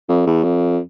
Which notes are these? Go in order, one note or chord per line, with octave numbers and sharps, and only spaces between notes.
F2
E2
F2